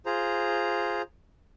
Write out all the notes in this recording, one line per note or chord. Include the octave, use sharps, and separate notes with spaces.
F4 G#4 C5 A#5